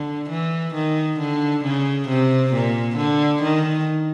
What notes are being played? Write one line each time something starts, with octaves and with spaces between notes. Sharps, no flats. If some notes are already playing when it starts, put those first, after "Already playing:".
Already playing: D3
E3
D#3
D3
C#3
C3
A#2
D3
D#3